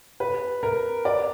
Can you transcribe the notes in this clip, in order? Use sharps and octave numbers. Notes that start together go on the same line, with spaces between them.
B4
A#4
D5